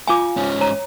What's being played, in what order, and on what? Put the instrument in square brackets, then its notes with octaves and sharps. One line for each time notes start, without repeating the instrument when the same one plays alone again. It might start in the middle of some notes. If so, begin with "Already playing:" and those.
[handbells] F4 F5 G#5 [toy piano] B5 D6
[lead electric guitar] G#2 C#4
[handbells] C#5 [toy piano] A#5